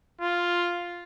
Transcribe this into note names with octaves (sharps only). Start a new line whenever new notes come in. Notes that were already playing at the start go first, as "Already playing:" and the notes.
F4